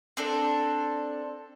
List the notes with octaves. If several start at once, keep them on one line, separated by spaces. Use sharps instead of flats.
C4 D4 A4